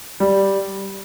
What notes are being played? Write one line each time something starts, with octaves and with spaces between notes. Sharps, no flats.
G3